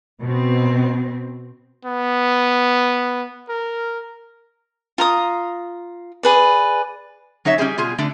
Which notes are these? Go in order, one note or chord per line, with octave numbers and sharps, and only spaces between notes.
B2 C4
B3
A#4
F4 A#5 D#6
G#4 B4 D5
F#3 D#4 C#5 E5
G3 C#4 G4 G#4 C5
B2 F4 G#4
D3 A3 D4